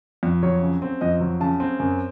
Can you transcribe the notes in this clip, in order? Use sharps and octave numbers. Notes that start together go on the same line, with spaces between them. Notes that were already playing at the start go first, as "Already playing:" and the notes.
F2
F#3 C#5
C#3
C4
F2 D#5
F#3
C#3 A5
C4
F#2